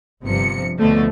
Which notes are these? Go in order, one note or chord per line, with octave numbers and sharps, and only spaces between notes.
G1 G2 C3 F3 C#7
D2 B2 D3 F3 A3